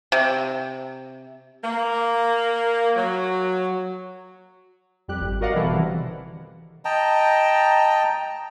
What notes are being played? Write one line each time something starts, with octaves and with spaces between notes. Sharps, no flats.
C3
A#3
F#3
F2 G3 G4 F#6
G#1
F#4 A#4 D5 D#5 F5 F#5
B2 E3 G3 E4 A4
C3 D#3 E3
D#5 G5 A5 A#5